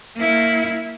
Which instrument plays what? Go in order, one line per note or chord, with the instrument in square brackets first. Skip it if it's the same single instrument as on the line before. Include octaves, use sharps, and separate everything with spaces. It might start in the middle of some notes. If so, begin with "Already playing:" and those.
[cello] A#3 E4